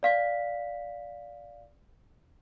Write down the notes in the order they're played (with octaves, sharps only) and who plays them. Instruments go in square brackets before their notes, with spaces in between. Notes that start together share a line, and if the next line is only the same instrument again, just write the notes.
[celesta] D5 F5 B6